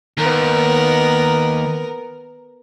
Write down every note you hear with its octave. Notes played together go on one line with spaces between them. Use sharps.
D#2 B3 A#4